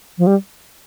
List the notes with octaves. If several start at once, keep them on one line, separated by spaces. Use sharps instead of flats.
F3
G3